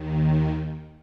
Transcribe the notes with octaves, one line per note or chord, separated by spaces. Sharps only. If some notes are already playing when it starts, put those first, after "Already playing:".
Already playing: D#2 D#3